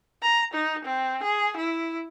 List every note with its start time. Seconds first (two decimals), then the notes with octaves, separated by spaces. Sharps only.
0.22 A#5
0.54 D#4
0.85 C4
1.24 G#4
1.57 E4